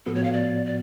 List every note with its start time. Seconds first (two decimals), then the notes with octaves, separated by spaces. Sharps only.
0.06 A2 F3 B3 F#4 A4
0.14 C#5
0.24 F5
0.33 D5
0.66 D5